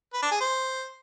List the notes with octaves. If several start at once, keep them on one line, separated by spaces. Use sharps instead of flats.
B4
D4
G#4
C5